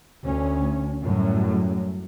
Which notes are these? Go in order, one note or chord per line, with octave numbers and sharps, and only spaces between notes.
D2 C#4
F#2 A2 F#3 G3